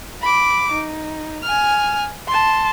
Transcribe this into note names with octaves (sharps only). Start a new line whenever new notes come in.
B5 D6
D#4
G#5 F6
A5 C6